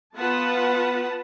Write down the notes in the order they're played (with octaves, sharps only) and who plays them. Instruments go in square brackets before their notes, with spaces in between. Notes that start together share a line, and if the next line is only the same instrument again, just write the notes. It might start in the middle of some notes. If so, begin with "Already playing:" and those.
[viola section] B3 F4 B4 F#5 A5